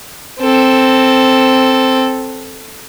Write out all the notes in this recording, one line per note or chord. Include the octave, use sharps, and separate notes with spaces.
C4 A4